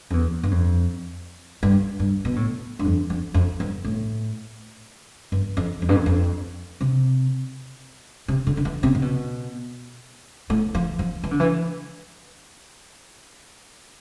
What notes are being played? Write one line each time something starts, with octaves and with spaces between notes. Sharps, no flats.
F2
E2
G2
F2
G2
G2
B2
A2
G2
F2
F2
F2
G2
A2
G2
F2
F2
G2
F2
F2
C3
C3
D3
D3
E3
C3
C3
B2
A2
F3
F3
E3
D3
E3